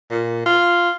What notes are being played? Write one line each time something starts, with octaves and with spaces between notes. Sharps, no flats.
A#2
F4